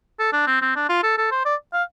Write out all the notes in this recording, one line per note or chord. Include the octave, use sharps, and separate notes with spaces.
A4
D4
C4
C4
D4
F4
A4
A4
C5
D5
F5